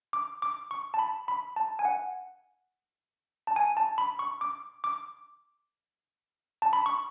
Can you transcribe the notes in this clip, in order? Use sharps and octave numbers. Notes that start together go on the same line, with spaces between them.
D6
D6
C#6
A5
B5
B5
A5
G#5
F#5
A5
G#5
A5
B5
C#6
D6
D6
A5
B5
C#6